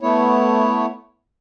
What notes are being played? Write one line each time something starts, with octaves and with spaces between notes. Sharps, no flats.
A3 B3 E4 C#5